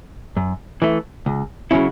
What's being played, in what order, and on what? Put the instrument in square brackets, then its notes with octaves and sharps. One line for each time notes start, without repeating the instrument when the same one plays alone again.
[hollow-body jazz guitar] F#2
E3 A3
C#2
C#3 F#3 C#4 E4